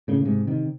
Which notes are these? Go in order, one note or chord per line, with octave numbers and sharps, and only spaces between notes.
A2 C#3
C#3
G#2 C3
C3 D#3